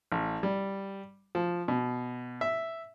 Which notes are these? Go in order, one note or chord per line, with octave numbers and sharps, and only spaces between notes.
A1
G3
F3
B2
E5